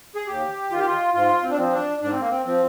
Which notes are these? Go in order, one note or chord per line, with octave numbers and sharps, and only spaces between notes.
G#4
D#2 G4
D#3 F4
G4
F4
G#2 F4
C4
D4
F3 C4
D4
G#2 D4
C4
A#3
C4
F3 C4